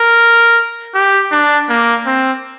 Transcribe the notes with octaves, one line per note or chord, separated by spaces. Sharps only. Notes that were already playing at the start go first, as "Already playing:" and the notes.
Already playing: A#4
G4
D4
A#3
C4